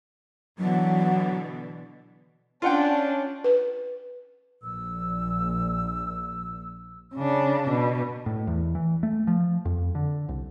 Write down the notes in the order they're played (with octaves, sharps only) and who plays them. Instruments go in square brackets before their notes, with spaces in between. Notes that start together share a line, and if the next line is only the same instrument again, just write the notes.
[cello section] B2 D3 E3 [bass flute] F#3
[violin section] C#4 D4 [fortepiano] F4 F#5 G5
[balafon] B4
[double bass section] A#1 [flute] E6
[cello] C#3 D4
B2
[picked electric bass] A2
E2
E3
A3
F3
F2
D3
C2